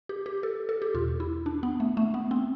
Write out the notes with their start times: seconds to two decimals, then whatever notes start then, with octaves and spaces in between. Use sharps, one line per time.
0.09 G4
0.26 G4
0.43 A4
0.69 A4
0.82 G4
0.94 E2 B2 F4
1.20 E4
1.46 D4
1.63 B3
1.80 A3
1.97 A3
2.14 B3
2.31 C4